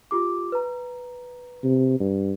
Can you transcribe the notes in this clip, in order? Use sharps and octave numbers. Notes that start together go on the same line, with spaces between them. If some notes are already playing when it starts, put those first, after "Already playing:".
F4 G4 D6
B4 A#5
C3
G2